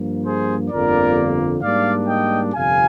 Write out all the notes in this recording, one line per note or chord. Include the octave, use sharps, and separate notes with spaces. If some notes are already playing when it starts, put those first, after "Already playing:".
Already playing: G2 F3 A#3
G#4 C5
G1 F2 D3 F3 A#3 A#4 D5
G#2 G3 A#3 D4 D5 F5
D#5 G5
G1 F2 C3 F5 G#5